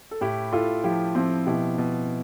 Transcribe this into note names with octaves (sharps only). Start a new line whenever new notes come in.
A4
A2 E4 G4
A2 F4 A4
F3 E4 G4
F3 C4 E4
B2 E4 G4
B2